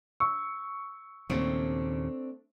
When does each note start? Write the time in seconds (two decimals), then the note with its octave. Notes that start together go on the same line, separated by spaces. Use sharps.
0.20 C#6 E6
1.30 D#2 A#2 C#3 A3 C4 D4